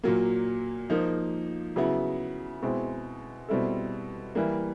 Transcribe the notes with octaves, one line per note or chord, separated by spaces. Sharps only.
A#2 F#3 A#3
F3 A#3 D#4
C#3 F#3 B3 E4
B2 G#3 C4 E4
B2 G3 C4 E4 A4
E3 G3 A#3